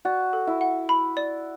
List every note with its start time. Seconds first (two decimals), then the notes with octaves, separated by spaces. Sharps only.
0.05 F#4 D5
0.33 A4
0.47 E4
0.61 F#5
0.89 B5
1.17 D5